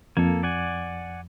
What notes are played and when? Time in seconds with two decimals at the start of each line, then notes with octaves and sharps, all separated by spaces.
0.17 F2 A#3 A4 G#6
0.43 D5 F#5 G#5